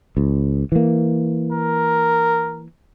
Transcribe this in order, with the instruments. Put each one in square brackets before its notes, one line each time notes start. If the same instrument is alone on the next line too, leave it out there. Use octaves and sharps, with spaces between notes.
[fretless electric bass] C#2
E3 A#3
[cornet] A#4